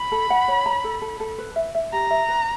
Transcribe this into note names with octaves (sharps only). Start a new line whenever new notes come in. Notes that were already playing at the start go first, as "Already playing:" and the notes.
Already playing: B5
A4
F#5
C#5
A#5
A4
A4
A4
B4
E5
E5
G4 A#5
E5
B4